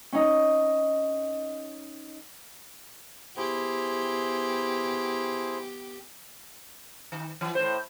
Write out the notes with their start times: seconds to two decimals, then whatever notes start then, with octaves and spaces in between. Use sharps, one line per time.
0.13 C#4 D#4
3.37 B3 E4 G4 G#4 C5
7.12 D#3
7.41 E3
7.55 A2 C5